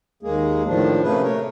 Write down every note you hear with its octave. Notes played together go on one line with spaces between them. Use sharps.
D#2 G#3 A#3 G#4
A2 D#3 F3 D4
C3 A3 A#3 C#4 G#4 B4
A3 A#4 C#5